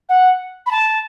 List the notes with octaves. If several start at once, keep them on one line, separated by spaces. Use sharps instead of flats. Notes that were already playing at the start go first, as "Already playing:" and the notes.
F#5
B5
A5